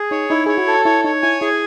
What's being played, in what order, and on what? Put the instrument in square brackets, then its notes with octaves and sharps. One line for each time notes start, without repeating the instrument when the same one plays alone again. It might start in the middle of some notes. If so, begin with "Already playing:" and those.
Already playing: [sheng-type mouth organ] G#4
[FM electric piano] D#4 [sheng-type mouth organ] C#5
[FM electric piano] D#4 [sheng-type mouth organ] E4
[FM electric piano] G#4 [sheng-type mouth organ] C#5
[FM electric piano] F#4
[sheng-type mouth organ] A4
[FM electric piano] E4 [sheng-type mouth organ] C#5
[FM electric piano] D#4 [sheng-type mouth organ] C#5
[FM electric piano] E4 [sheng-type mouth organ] G#5
[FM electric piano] E4 [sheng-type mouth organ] G#4